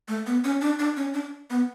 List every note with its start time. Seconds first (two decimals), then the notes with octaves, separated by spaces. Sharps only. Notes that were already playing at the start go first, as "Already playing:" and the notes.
0.08 A3
0.27 B3
0.44 C#4
0.61 D4
0.79 D4
0.97 C#4
1.14 D4
1.50 B3